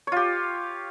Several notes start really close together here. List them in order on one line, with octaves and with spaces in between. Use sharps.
C#5 F4 G4